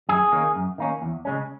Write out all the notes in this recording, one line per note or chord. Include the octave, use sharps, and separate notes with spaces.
F#2 G#4
D#3 A#3 C#4
F#2
D#3 A#3 C#4
E2
C#3 G#3 C#4